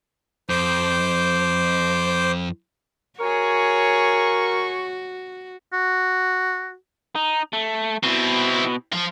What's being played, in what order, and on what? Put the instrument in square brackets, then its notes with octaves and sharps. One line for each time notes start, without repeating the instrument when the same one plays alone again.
[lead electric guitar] F2 [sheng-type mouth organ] C5 D6 G6
[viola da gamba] F#4 [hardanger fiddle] G#4 C#5 [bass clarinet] A#4 [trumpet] C#6
[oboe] F#4
[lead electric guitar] D#4
A3
[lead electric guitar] B2 [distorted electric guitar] C4 E4
[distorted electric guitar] F3 F4